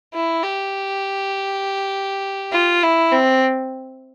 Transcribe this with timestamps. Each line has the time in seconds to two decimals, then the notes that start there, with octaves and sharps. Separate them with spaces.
0.14 E4
0.43 G4
2.52 F4
2.83 E4
3.12 C4